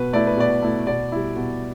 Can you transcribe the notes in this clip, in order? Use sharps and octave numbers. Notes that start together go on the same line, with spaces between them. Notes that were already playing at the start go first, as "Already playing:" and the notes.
Already playing: B2 B4
A3 E4 D5
B4
B2 D5
A3 E4
B2 D5
G3 E4
B2